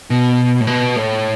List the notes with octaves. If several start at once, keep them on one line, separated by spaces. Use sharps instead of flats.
B2
A2
B2
A2